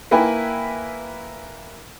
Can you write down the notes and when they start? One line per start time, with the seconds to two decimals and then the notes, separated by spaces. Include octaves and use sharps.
0.11 A#3 E4 B4 G5 G#5